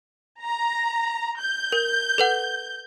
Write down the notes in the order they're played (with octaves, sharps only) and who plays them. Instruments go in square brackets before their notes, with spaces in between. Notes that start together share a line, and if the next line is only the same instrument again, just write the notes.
[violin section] A#5
G6
[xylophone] A#4
A4 B4 F#5